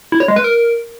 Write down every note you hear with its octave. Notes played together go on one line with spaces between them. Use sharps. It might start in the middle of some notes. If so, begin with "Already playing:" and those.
E4
C#5
G#3
B4
A#4